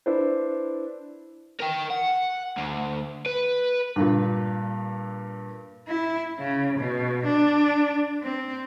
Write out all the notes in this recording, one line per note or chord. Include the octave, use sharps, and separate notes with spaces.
D4 E4 B4 C5
A#4 G5
F#5
D2
B4
G2 A#2
E4
C#3
B2
D4
C4